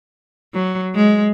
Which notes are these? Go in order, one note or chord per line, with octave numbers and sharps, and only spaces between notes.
F#3
G#3